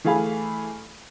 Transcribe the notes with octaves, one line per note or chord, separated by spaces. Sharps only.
E3 A3 G#4 F5 G#5 B5